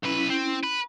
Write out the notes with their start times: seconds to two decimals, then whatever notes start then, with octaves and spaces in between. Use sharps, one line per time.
0.04 B1 C#4 E4 B4
0.30 C4
0.63 B4